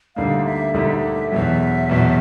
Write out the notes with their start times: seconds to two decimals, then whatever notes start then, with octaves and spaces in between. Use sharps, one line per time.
0.16 D2 D3 G3 A#3 D#4 F5
0.46 E5
0.74 D2 D3 G3 A#3 D#4 E5
1.32 E2 B2 F#3 E5
1.89 E2 B2 F#3